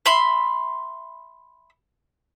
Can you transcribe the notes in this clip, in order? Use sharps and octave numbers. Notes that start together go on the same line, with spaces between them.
E5 B5 C6